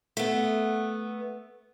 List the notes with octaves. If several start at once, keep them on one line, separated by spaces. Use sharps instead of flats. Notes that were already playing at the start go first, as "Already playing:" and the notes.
A3 B3